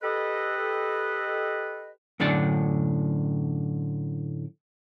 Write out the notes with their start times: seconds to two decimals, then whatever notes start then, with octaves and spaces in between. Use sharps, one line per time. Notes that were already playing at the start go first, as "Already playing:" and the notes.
0.02 G4 A4 B4 D#5
2.20 F#2 A2 D3 D4 D5